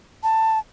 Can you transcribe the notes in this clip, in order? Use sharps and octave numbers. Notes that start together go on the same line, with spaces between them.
A5